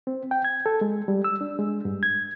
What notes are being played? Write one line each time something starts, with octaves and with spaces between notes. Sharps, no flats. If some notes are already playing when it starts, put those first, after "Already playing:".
C4
G5
G#6
A4
G#3
G3
E6
D4
G#3
G2
G#6